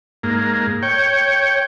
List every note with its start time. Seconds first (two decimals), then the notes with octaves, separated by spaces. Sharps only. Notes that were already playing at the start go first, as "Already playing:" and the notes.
0.23 G#2 A#3
0.83 C#5 G5